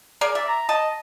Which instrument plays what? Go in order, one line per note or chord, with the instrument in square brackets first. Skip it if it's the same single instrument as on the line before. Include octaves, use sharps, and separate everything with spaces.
[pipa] G#4 A#4 D5
[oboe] D5 [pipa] E5
[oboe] A#5
[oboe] D#5 [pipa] A5